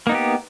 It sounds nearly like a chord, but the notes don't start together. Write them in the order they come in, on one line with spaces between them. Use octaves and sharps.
A#3 D#4 B3 G4